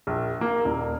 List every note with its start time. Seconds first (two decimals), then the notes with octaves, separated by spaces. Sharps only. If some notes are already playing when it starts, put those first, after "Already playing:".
0.07 A#1
0.41 A#3
0.65 D#1